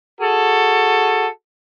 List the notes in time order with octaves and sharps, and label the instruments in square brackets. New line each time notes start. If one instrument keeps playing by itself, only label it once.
[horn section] F#4 G#4 A4